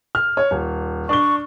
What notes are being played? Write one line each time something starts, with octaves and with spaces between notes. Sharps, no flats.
F6
C#5
D#1
D4 D5 C#6 G7